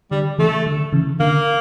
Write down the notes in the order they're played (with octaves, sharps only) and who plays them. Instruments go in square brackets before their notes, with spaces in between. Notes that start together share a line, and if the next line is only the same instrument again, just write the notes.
[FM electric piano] D3 [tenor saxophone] G3
[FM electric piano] C#3 E3 [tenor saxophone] A3
[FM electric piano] D3
C#3 E3
[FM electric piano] D3 [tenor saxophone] A#3